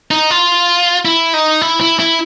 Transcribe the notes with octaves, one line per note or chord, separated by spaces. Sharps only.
D#4
F4
E4
D#4
E4
E4
E4